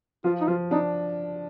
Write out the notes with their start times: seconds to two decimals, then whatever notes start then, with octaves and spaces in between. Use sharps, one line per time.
0.24 F3 F4
0.41 D#4
0.48 F3 F4
0.71 D4 D#4